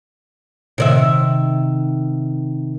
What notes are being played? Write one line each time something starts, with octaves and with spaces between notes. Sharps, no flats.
C3 D#3 E5